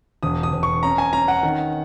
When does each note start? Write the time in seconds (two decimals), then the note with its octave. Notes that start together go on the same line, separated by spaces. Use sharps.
0.23 E1 D#6
0.43 D#6
0.52 E1
0.63 C#6
0.83 C#4 A#5
0.98 G#5
1.13 C#4 A#5
1.28 F#5
1.43 D#3